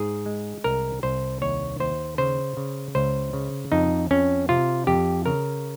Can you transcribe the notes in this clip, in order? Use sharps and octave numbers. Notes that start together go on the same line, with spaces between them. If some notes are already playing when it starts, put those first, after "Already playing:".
Already playing: G#2 G#4
G#3
C2 A#4
C2 C5
D#2 C#5
D#2 C5
C#3 C5
C#3
C#2 C5
C#3
F2 D#4
F2 C#4
C3 F4
F2 G4
C#3 A#4